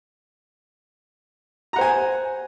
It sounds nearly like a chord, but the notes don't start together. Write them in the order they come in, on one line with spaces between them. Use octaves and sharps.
A#5 F#5 C5 G#5